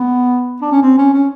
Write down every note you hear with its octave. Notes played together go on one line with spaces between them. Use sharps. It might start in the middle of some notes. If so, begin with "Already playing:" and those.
Already playing: B3
D4
C#4
C4
C#4
C#4